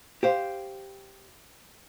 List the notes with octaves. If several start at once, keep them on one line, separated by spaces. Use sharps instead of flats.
G4 C5 F5